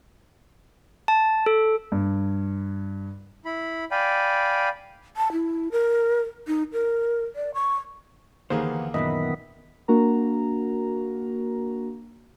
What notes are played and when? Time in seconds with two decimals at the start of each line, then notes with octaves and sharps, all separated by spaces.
1.08 A5
1.46 A4
1.92 G2
3.45 E4 B5
3.91 D5 F5 G5 G#5 B5
5.17 A5
5.32 E4
5.72 A#4
6.47 D#4
6.73 A#4
7.36 D5
7.54 C#6
8.50 D#2 D3 E3 A#3 B3 G#4 C5
8.94 F#2 A#2 D#3 E3 B3 D#5 E5 B5
9.88 A#3 D4 F#4 A#4 A#5